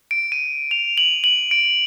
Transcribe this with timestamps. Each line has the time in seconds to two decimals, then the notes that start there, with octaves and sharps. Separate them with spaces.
0.11 D7
0.32 D#7
0.71 F7
0.98 F#7
1.24 F#7
1.51 D7